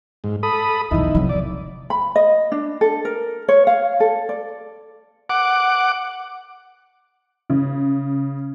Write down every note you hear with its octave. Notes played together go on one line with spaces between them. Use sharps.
G#2
A4 B5 D#6
B1 E2 D#4 E4
C3 F#3
E2 D3 D5
B5
D#5
D4
A4
A#4
C#5
F5
A4
D5
F#5 D6
C#3